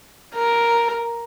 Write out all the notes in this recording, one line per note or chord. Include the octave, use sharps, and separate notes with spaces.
A#4